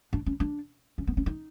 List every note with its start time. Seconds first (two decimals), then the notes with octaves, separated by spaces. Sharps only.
0.13 D4
0.26 C#4
0.40 D4
0.98 C#4
1.07 B3
1.17 C#4
1.26 D#4